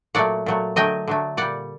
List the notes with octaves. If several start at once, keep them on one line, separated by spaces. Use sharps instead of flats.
A#2 F#3 A3 D5 F#5
A#2 F#3 A3
D3 F#3 A3 D#5 G5
D3 F#3 A3
A#2 G3 D5 F#5